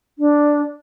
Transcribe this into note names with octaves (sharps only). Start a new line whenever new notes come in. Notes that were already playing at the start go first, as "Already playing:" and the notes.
D4